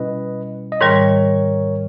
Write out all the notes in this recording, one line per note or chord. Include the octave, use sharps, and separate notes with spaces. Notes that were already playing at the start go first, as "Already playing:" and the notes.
Already playing: B2 G3 C#4 E4 B4 D#5
D#5
G#2 D#3 G3 A#4 C#5